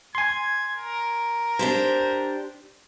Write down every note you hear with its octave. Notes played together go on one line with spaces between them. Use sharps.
G#5 C6 G#6
A#4
D4 G4 C5